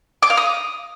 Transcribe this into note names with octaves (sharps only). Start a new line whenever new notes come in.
D6
F5
D#6